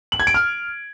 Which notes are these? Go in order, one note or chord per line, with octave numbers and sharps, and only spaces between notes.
F#7
G#6
D7
F6